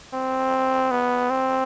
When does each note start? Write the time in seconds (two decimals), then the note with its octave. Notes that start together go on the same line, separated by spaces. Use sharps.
0.13 C4
0.91 B3
1.30 C4